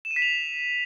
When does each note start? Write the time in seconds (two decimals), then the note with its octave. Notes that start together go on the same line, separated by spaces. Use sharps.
0.05 E7
0.11 D#7
0.16 B6
0.22 F7